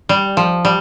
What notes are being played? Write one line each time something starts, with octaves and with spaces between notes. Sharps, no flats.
G3
F3
G3